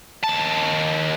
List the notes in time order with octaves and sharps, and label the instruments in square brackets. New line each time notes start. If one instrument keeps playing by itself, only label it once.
[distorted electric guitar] D#2 A5